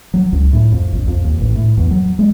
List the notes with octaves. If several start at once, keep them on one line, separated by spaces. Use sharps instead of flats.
F#3
C#2
A2
F2
A#1
F2
D#2
A1
A2
E2
F#3
G#3